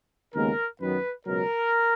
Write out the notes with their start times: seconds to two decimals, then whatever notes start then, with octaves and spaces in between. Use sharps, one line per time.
0.33 D#2 C#3 G#3 B3 A#4
0.80 F#2 D#3 F#3 B3 B4
1.26 C#2 B2 F#3 A#4